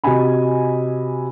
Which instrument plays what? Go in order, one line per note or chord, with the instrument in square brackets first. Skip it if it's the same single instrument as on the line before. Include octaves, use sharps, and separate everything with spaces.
[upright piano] C3 F#4 D#5 G#5 B5